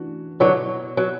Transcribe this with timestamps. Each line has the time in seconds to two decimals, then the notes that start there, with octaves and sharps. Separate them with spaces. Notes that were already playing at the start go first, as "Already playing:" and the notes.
Already playing: E3 D4 F#4
0.40 B2 D3 F#3 B3 E4
0.97 F#3